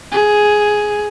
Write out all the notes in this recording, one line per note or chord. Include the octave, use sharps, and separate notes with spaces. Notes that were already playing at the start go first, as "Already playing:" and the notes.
G#4